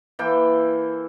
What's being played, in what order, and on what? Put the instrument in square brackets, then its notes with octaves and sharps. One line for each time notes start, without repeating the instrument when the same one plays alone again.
[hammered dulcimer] E3 A#3 A4 G5